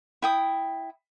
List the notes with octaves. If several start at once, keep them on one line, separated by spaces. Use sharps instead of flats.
E4 G5 D#6